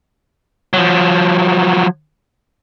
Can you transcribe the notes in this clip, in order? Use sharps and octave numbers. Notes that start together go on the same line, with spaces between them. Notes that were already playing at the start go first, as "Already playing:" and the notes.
F3 F#3